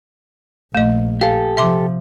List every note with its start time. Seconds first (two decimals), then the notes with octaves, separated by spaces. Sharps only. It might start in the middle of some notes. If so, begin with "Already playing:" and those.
0.75 A#1 A3 D#5
1.21 G4 A4 F5
1.57 C3 F3 E5 C6 D6